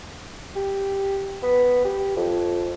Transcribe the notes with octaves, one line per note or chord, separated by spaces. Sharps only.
G4
B3
G4
F2